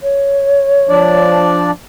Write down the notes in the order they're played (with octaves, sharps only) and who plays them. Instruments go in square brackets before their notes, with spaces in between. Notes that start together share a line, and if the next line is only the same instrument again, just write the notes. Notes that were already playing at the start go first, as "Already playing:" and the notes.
[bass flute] C#5
[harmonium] F3 D4 D5